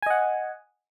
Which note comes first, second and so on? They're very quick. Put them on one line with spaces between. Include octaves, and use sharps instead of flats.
G#5 D#5 F#5